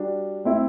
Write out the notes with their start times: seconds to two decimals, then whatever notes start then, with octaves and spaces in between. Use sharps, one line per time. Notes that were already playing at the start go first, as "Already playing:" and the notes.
Already playing: G3 D4 F#4
0.45 A3 C4 E4